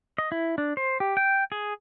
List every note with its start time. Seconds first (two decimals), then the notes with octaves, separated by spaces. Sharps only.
0.18 D#5
0.32 E4
0.58 D4
0.77 C5
1.00 G4
1.17 G5
1.52 G#4